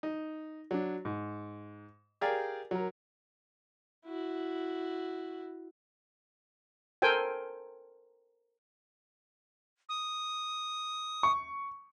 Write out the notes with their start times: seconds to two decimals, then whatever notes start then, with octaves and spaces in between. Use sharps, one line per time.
0.03 D#4
0.71 F#3 D4
1.05 G#2
2.21 G4 G#4 A#4 D5 F5 G5
2.71 F#3 A#4
4.06 E4 F#4
7.02 A4 A#4 C5 G5 G#5
9.89 D#6
11.23 C#6